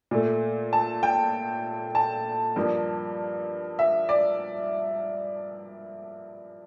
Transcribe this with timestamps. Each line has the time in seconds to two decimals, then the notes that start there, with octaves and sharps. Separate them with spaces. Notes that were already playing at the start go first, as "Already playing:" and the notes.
0.11 A#2 A3
0.73 A5
1.03 G5
1.95 A5
2.56 G2 F3 A#3
3.79 E5
4.09 D5